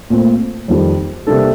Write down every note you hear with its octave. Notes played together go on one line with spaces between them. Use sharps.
A#2 A3 C4
F2 D#3 G3
C3 G3 A#3 D4 A4